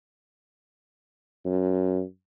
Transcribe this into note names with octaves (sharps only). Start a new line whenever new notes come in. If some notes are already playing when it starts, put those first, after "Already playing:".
F#2